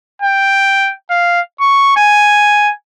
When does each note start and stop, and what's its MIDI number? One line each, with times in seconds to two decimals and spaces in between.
0.22 0.92 79
1.11 1.41 77
1.60 1.95 85
1.97 2.71 80